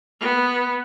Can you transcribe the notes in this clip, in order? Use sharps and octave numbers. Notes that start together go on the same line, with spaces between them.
B3